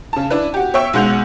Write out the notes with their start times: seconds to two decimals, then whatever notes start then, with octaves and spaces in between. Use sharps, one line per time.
0.13 C#3 A5
0.30 D4 E4 B4
0.54 F#4 G4
0.74 C#5 E5 G5 C#6 E6
0.93 B1 G#3 F#5 G6 F7